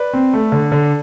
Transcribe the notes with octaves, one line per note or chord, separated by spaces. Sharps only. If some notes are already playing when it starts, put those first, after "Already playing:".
Already playing: B4 D5
C4
A3
D3
D3